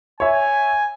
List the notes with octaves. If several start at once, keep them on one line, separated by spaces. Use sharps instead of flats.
C#5 E5 G#5